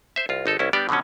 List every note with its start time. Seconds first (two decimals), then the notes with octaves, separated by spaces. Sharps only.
0.16 C5 E5
0.29 C2 F4
0.46 G#1 D#4 A4
0.59 C2 C#4 E4
0.73 G3 B3 D4 G4 D5
0.89 B2 D3 F3 F#3 C#4